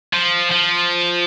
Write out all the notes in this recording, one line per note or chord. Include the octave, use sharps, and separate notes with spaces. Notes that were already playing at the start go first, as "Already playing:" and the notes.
F3
F3